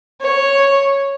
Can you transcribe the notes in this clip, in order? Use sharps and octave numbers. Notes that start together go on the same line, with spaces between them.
C#5